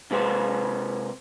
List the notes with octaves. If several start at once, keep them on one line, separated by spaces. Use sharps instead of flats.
C3 G#3 B4 C5